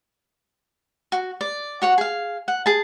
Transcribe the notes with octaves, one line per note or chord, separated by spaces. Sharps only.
F#4
D5
F#4 C#5 F#5
G#4 F5
F#5
G#4 A5